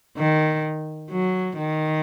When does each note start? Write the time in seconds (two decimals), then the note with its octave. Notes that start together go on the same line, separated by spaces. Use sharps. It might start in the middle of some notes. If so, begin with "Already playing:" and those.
0.18 D#3
1.11 F#3
1.57 D#3